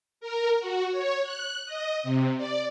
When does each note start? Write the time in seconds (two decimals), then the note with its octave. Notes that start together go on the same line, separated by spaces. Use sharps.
0.21 A#4
0.59 F#4
0.92 C#5
1.23 F#6
1.66 D#5
2.03 C3
2.37 D5